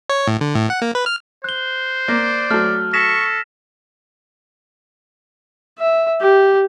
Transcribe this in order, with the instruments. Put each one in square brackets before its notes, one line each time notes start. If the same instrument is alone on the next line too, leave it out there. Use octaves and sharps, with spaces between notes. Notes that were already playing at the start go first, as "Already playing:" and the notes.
[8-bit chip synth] C#5
A2
D3
A2
F#5
A#3
B4
F6
[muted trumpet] C5 [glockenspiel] F#6 G7
[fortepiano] A#3 [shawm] D5
[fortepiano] F#3 A3 [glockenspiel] F6
[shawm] A4 [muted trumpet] C#6 [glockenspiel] A#6 B6 E7
[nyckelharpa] E5
G4